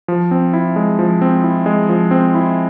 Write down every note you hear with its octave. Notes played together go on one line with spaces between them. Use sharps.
F3
C4
E4
G#3
F3
C4
E4
G#3
F3
C4
E4